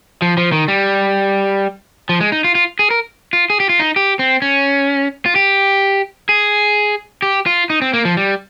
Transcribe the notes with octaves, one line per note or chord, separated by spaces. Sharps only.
F3
F3
D#3
G3
F3
G#3
D#4
F4
F4
G#4
A#4
F4
G#4
G4
F4
D#4
G4
C4
C#4
F4
G4
G#4
G4
F4
D#4
C4
A#3
F3
G3